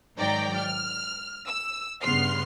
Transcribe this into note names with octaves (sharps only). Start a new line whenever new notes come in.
G#2 D#3 F#3 D5 G5 A#5
F6
E6
G2 C#3 B3 C6 F6 C7